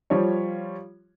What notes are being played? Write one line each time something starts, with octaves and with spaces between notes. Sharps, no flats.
F3 G3 F4 C#5